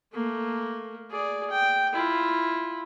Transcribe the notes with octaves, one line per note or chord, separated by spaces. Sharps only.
A3 A#3
G#4 D5
G5
E4 F4